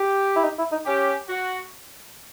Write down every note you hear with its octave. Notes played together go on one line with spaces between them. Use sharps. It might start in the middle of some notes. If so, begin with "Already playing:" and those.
Already playing: G4
E4
D#4
E4
D#4
C#4 G4
F#4